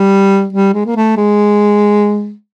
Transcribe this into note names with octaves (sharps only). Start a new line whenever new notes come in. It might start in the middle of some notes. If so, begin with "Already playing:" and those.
Already playing: G3
G3
G#3
A#3
A3
G#3